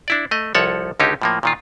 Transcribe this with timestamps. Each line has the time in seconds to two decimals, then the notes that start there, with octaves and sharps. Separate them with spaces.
0.08 D4 E4 D5
0.31 A3 D#5
0.55 C2 F3 A4 C#5 F#5
1.00 C#2 D3 C#4 D#4 G4
1.22 A2 F3 A#3
1.43 A#2 D#3 F4